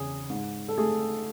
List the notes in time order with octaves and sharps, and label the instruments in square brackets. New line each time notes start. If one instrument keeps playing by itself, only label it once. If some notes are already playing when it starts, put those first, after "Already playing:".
Already playing: [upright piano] E2 C#3 G#4
G#2
A4
A3 G#4